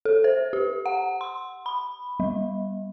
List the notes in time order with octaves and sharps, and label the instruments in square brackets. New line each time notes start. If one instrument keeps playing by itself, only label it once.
[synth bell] A4
C5
G4
F#5
C6
B5
G3